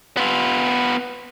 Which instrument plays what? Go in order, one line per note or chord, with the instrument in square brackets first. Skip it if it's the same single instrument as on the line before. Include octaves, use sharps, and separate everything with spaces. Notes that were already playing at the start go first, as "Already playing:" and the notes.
[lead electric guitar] B3 F4